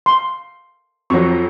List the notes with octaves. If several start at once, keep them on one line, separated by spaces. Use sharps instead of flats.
C6
F2 F3 F#3 C#6